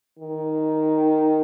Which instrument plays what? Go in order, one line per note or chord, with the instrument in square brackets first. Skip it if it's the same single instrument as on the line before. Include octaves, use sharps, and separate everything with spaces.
[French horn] D#3